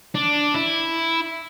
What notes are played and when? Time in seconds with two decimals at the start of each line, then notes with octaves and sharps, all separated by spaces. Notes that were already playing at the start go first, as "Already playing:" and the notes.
0.15 D4
0.55 E4